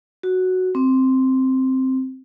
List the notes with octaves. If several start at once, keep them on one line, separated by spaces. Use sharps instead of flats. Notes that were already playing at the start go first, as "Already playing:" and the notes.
F#4
C4